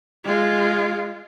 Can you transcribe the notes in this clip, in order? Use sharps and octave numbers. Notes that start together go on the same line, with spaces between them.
G#3 F4